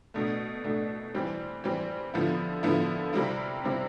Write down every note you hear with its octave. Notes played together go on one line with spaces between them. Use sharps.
B2 A3 D4
B2 A3 D4
E3 G3 C4
E3 G3 C4
D3 F3 B3 E4
D3 F3 B3 E4
C3 G3 C4 E4
C3 G3 C4 E4